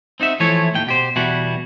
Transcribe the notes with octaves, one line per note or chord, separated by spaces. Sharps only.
C4 D#4 F#4 E5
E3 F3 A3 E4 C#5
D#2 A2 G5
B2 G4 C5
E2 B2 G3 E4 F#4